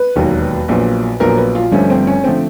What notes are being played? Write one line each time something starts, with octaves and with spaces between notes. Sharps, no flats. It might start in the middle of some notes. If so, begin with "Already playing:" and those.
Already playing: B4
E1 D#2 D#3 F#3
A#1 A#2 F#3 B3
A#1 A#2 F#3 B3 A#4
B4
F4
G1 G2 D3 F3 A3 C#4
C4
C#4
D3 F3 A3 C4